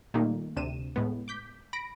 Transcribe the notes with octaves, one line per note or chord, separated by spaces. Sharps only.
A#2 D#3 G3 A3 A#3 D#4
D2 C3 D4 D#7 E7
A2 G#3 B3
D6 G6 B6
B5 A#6 D7